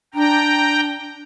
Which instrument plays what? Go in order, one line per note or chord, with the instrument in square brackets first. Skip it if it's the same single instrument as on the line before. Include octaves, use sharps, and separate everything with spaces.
[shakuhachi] D4 [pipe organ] G5 A#5